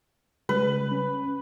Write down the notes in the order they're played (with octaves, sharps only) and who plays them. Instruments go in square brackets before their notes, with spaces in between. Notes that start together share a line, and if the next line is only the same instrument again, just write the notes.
[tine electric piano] C#3 G3 G#3 [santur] B4
[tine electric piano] C#4